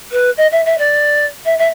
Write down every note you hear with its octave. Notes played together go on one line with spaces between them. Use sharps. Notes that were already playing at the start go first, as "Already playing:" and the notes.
B4
D#5
E5
E5
D5
E5
E5